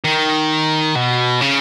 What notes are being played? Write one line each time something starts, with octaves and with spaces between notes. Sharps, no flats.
D#3
B2
C#3